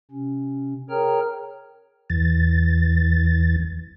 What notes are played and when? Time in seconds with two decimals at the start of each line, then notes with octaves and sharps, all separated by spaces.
0.11 C3 C#4
0.90 G#4 A#4 C#5 G5 A#5 F6
2.10 E2 E3 A6